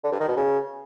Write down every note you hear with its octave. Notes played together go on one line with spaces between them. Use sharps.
D3
G2
D#3
B2
C#3